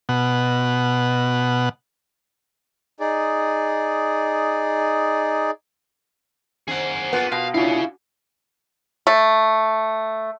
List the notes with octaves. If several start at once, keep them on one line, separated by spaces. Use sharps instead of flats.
B2 F#5
D#4 G#4 D5
D#3 A#3 C4 G#4 F#5
A#3 B3 F4 B4
B2 F5
C#4 D4 E4 F4 G#4 F5
A3